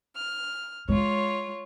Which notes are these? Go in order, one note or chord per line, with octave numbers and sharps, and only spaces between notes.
F6
G#3 F4 C#5